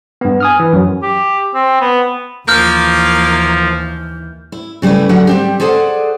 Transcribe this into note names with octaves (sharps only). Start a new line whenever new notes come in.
G2 B3
G#5 D#6 F6
E3
F#2 F#3
G4
C4
B3
D#2 E3 F3 A#3 F6 G6
E4
C#3 G3 A3 E4 B4
D3 F#3 A#4 F#5 A5
G3 C4 G4
G#4 A4 C5 D5 F#5